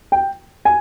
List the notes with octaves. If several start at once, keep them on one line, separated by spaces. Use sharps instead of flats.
G5
G#5